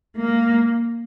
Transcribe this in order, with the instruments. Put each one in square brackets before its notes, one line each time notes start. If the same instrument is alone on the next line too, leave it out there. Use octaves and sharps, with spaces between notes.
[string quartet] A#3